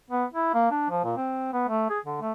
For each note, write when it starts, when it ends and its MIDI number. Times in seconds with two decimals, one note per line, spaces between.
0.10 0.24 59
0.33 0.50 64
0.54 0.67 58
0.71 0.89 62
0.90 1.03 53
1.04 1.14 46
1.17 1.50 60
1.53 1.67 59
1.68 1.88 57
1.90 1.99 68
2.05 2.19 50
2.21 2.32 57